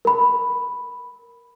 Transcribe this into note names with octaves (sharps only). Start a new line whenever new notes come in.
A#4 B5